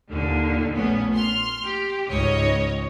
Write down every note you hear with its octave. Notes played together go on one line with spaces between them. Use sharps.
D#2 A#2 D3
A#1 A3 B3 C#4
C6 F6
G4
C#2 G#2 C#5 D#5